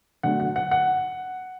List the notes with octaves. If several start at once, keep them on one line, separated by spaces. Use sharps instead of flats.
D3 F#3 A3 F#5
F#5
F#5
F#5